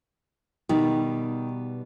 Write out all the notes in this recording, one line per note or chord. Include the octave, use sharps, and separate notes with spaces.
B2 D#3 G3 B3